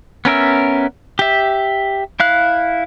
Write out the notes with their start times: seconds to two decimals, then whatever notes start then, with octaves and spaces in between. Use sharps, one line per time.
0.25 B3 C#4 A#4 E5
1.19 G4 E5
2.20 E4 F5 F#6